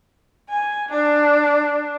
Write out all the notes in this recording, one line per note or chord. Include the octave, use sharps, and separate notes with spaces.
G#5
D4